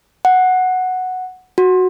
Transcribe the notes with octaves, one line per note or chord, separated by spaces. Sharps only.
F#5
F#4